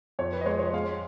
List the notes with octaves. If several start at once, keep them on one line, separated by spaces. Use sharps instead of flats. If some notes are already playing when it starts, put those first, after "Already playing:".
F2 C#5
B4
D#5
G#3 C#5
C#5
G#3 F5